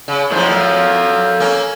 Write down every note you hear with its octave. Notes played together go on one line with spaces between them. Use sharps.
C#3
F#2 A2 F3 D4 C5
A4 F5
A#3 C#4